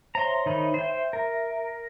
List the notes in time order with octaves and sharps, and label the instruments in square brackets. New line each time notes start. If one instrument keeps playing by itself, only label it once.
[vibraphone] C5 C#5 E5 [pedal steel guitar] A#5 C6
[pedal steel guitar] D#3 D#4 B5
[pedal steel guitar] C5 G5 [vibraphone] E5
[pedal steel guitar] A#4